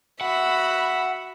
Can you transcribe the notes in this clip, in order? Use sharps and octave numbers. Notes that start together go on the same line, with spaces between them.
F#4 E5 F#5 B5